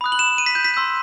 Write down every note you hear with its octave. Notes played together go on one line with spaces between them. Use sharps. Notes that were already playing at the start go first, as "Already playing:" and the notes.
B5 D#6 F#6
F#7
E7
D#7
B6
G6
B6
C6 E6 G6